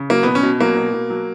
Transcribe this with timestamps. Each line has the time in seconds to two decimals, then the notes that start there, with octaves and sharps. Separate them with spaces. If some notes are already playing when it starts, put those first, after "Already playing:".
Already playing: C#3
0.10 F#3 A#3
0.23 B2 B3
0.35 C#4
0.43 B2
0.60 F#3 A#3
0.77 B2
0.93 B2
1.10 F#3